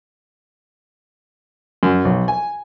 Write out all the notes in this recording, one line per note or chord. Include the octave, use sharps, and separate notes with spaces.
F#2
B1
G#5